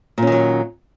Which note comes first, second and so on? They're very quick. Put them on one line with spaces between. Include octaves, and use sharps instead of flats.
A#2 C#4 D#3 F#3